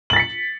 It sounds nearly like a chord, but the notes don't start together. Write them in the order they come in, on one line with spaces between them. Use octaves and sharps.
F#7 A6 B6 C#7